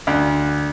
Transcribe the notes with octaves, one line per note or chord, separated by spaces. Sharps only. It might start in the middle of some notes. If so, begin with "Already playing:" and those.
D2